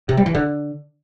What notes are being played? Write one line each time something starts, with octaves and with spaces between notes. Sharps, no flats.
C3
G3
E3
D3